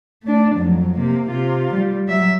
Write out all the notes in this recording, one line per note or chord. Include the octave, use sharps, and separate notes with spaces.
A3 D4
F2 F#3
C3 A#3
C3 F4
G3
F#3 E5